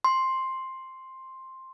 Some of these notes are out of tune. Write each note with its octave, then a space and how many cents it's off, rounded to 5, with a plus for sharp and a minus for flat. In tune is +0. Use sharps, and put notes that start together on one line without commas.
C6 +10